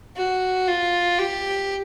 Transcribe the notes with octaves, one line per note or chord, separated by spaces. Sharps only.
F#4
F4
G4